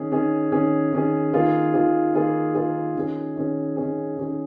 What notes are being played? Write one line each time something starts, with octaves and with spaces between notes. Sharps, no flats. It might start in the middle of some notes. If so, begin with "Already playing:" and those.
Already playing: D#3 C#4 G#4
D#3 C#4 G#4
D#3 C#4 G#4
D#3 C#4 G#4
D#3 A#3 F4 G#4
D#3 A#3 F4 G#4
D#3 A#3 F4 G#4
D#3 A#3 F4 G#4
D#3 C#4 G#4
D#3 C#4 G#4
D#3 C#4 G#4
D#3 C#4 G#4